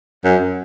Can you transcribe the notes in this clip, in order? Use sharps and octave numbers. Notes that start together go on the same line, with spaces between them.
F#2